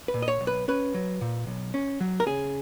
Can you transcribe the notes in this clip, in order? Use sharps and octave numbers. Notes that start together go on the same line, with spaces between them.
B4
A#2
D#5
C#5
B1
B4
C#4 B4
F#3
A#2
B1
C#4
F#3
A#4
C#3 G#4